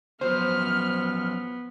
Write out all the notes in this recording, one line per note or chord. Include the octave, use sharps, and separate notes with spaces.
F3 F#3 B3 C#4 C5 F6